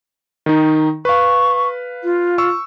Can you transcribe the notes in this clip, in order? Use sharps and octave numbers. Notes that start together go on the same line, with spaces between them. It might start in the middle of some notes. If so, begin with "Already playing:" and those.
D#3 D#4
B4 F5 C#6
F4
C#6 E6